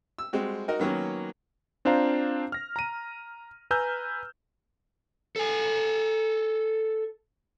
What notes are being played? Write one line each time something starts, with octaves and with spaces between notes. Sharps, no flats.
E6
G3 G#3 C4 F#4
D#4 F#4 A#4 D#5
D#3 F#3 A#3 B3 C#4
C4 D4 F4 C5 F5 A#5
F6 A#6
A#5 D#7
B4 G#5 A#5 E6 F6 G6
A4 G#5